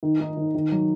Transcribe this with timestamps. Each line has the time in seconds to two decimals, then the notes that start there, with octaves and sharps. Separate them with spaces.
0.03 D#3
0.20 D#4
0.37 D#3
0.55 D#3
0.72 F#3